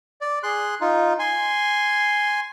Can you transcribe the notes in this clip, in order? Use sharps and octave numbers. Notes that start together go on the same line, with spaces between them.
D5
G#4 C6 F#6
D#4 F4
G#5 C6